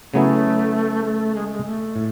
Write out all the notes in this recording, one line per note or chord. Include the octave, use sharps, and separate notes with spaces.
C#3 F#3 A3 B3 E4 G#4
A3
G#3
G#3
A3
A2